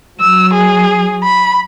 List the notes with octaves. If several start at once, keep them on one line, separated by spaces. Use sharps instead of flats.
F#3 E6
G#4
B5